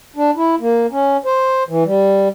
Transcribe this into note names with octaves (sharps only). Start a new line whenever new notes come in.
D4
E4
A#3
C#4
C5
E3
G3